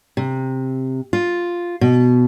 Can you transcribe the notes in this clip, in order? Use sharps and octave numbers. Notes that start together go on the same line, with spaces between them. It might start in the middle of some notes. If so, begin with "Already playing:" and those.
C3
F4
B2